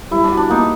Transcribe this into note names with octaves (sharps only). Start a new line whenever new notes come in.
G3 E4
D4
F#4
D4
A#3 D#4